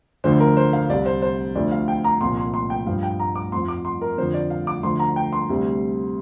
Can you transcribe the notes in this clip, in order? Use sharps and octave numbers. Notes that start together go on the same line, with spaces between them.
D2 D3 F3 C5
A#4
C5
F5
C2 C3 G3 D5
C5
C5
D2 D3 F3 D5
F5
G5
A#5
C2 A#2 F3 C6
C6
C6
G5
G2 F3 F5
G5
A#5
D6
F2 F3 C6
D6
C6
A#4
F2 D3 F3 C5
D5
F5
D6
D2 D3 F3 C6
A#5
G5
C6
D2 C3 G3